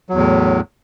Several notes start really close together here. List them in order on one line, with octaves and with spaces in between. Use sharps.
F#3 E2 A2